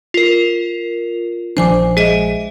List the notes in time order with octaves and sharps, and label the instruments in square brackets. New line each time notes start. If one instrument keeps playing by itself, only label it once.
[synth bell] F4 A#4
[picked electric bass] A#1 F3 D4 [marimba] C5 G#5 D6
[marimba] G#3 D#5 E5 [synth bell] G#4